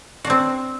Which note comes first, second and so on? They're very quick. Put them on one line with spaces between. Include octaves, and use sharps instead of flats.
F#4 D4 C4